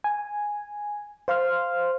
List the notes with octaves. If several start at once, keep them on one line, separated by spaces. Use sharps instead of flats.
G#5
C5 F5 C6 F6